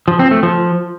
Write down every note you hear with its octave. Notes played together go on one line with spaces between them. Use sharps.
F3
C4
A3
F3